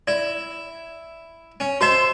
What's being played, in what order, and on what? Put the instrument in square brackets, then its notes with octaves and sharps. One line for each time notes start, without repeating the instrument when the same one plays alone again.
[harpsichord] E4 [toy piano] D5
[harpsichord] C#4
[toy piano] F#4 D#5 [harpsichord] C5 E5